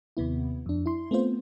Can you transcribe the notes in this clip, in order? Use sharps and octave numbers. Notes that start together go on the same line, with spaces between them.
D#2 C3 B3 E4
F2 D4
E4 C6
A3 B3 C4 F4 C5